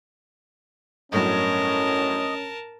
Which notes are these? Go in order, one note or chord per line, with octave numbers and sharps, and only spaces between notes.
G1 A2 F#3 C#4 A#4 D#5 A5